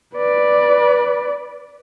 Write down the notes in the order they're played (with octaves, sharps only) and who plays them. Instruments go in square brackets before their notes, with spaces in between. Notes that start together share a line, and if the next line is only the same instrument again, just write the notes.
[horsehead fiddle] B4 D5